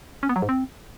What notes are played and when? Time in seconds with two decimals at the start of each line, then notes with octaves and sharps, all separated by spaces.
0.23 C#4
0.29 B3
0.36 F#3
0.42 G#2
0.49 C4